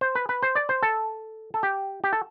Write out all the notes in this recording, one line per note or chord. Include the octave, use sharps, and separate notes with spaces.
C5
B4
B4
C5
D5
C5
A4
A4
G4
G4
A4